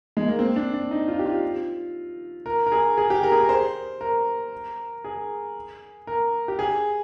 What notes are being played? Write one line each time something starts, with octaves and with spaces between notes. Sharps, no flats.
G#3
A#3
C4
D4
D4
D#4
F4
G4
F4
A#4
A#4
G#4
G#4
G4
A#4
G#4
A#4
C5
A#4
G#4
A#4
G4
G#4